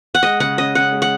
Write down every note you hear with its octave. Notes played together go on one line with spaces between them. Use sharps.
F#5
G#3 D#5
C#3 F#5
C#4 D#5
C#4 F#5
G#3
F#5